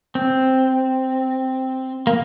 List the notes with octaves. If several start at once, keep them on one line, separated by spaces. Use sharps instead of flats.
C4
A#3